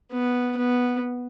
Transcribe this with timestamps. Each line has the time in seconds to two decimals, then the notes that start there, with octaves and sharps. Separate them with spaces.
0.12 B3
0.57 B3